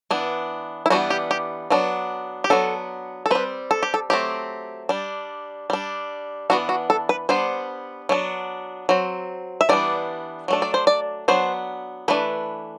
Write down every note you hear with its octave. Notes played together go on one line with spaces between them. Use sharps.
E3 B3 D4
E4
E3 G3 B3 D4 F#4
G4
G4
F#3 B3 D4
G4
F#3 B3 D4 A4
A4
G3 C4 B4
A4
G4
A4
F#3 A3 C4 G4
G3 D4
G3 D4
E3 B3 D4 F#4
F#4
A4
B4
G3 B3 D4 C5
F#3 B3 D4
F#3 C4
E5
E3 G3 B3 D4 D5
F#3 A3 D4
D5
C5
D5
F#3 B3 D4 C5
E3 A3 D4 B4